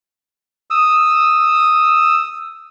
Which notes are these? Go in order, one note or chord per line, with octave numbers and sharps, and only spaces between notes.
D#6 E6